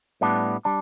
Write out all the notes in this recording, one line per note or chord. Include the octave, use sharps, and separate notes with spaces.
A2 G3 B3 D4
G3 D4